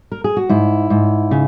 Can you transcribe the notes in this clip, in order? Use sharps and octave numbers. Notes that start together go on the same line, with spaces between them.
A#4
G#4
F#4
G#2 E4
G#2
C#3